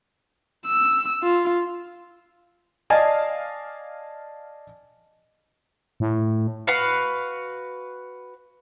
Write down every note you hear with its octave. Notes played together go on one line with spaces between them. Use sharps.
E6
F4
D5 D#5 F5 G#5 A5
A2
F#4 B4 F5